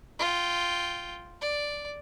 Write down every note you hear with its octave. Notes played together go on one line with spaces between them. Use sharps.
F4 G5
D5